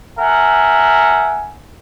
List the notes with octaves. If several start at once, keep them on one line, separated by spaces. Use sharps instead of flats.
A#4 E5 F#5 G#5